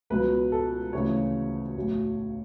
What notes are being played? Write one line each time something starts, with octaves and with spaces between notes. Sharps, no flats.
C#2 B2 F#3 B4
A4
D2 C#3 E3 C#5
B1 A2 F#3